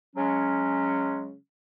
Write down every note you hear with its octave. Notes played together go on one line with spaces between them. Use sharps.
C#3 F#3 G#3 C#4